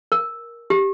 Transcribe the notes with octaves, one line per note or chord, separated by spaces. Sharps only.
A#4
G4